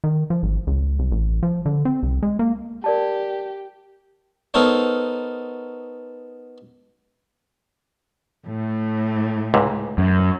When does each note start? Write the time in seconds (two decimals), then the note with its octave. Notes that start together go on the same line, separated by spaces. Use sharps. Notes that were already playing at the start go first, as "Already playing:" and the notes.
0.04 D#3
0.30 F3
0.43 G#1
0.67 C#2
0.99 C2
1.12 A1
1.43 F3
1.66 D3
1.85 C4
2.03 C2
2.23 G#3
2.39 A#3
2.84 G4 A#4 D5 A5
4.54 B3 D#4 A4 A#4 C5 C#5
8.47 A2 A3
9.54 C#2 G#2 C3
9.98 F#2